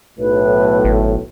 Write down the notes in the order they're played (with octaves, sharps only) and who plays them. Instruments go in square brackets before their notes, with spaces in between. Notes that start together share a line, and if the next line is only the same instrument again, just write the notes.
[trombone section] B1 A2 [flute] B4
[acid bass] G#1